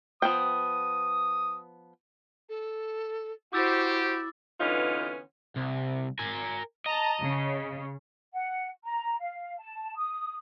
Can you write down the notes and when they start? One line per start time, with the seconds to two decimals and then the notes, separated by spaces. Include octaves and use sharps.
0.22 F3 B3 G5 D#6
2.49 A4
3.53 E4 F#4 G4 C5 D6 E6 A6
4.60 D3 E3 B3 C#4 D#4 F4
5.56 C2
6.19 A#4 G#5
6.86 D#5 A5 A#5
7.20 C#3
8.34 F#5
8.84 A#5
9.20 F5
9.59 A5
9.96 D#6